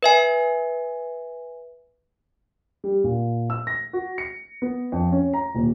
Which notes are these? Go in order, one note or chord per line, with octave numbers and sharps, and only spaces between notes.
B4 E5 G#5
G3
A#2
E6
A#6
F#4
C#7
B3
F2
C#4
A#5
D#1